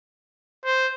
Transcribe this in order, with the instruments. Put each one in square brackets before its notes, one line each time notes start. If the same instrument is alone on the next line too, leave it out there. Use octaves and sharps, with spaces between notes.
[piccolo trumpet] C5